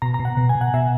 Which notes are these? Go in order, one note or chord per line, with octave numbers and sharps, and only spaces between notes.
B2 A#5
A#5
B2
F#5
B2
G#5
B2
F#5
B2 E5